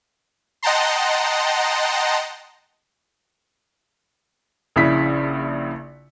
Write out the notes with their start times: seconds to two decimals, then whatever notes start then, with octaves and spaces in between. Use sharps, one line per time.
0.63 D#5 F#5 G5 A5 A#5 C6
4.76 A#1 C#3 E4 B6